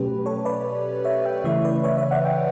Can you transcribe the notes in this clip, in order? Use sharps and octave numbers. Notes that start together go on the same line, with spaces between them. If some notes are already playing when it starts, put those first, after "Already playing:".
Already playing: B2 F#3 A3 C#4 G4 B4
A4 C#5
B4 D5
C#5 E5
E5 G5
C#3 E3 A3 C#5 E5
B4 D5
C#5 E5
C#5 E5
D5 F#5
E5 G5